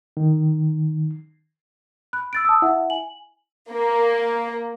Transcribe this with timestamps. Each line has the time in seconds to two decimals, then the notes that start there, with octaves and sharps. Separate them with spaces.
0.17 D#3
2.13 B5 F#6
2.33 E6 A6 D7
2.45 A5 D#6 E6
2.62 E4 E5 F#5
2.90 G#5 F#7
3.72 A#3